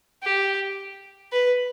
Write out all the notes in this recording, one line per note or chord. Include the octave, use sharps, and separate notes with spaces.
G4
B4